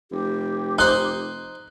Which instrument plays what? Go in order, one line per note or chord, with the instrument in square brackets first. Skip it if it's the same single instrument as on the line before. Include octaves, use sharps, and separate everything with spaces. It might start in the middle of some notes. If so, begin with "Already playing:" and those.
[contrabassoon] F1 [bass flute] G4
[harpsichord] D#4 C5 [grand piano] F#6